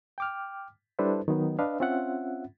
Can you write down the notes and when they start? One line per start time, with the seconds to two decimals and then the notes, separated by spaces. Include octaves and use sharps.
0.18 G5 D6 F6
0.99 G3 D4 E4 A4 B4 C5
1.28 D#3 F#3 B3 D#4
1.59 D4 B4 D#5 F5
1.80 C4 C#4 F4 E5 F#5